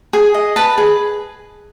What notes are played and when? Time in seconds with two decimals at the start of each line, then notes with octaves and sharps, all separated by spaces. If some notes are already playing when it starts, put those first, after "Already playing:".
0.13 G#4 G#5
0.34 D#5
0.56 B4 A5
0.78 G#4